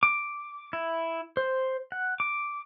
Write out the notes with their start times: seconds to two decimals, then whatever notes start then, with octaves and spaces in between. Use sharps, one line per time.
0.03 D6
0.73 E4
1.37 C5
1.92 F#5
2.20 D6